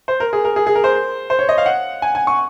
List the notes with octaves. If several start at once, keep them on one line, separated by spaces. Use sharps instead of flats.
C5
A#4
G#4
A#4
G#4
G#4
A#4
C5
C5
C#5
D#5
F5
F#5
G#5
G#5
C#6